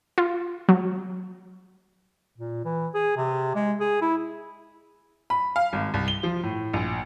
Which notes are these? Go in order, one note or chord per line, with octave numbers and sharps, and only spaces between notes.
F4
F#3
A#2
E3
G#4
C3
G#3
G#4
E4
B5
F5
G#1
C2
G7
F3
A2
A#1